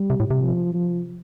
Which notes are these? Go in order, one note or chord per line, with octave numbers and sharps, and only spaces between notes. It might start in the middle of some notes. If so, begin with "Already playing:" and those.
Already playing: G3
C3
A2
C3
F3
F3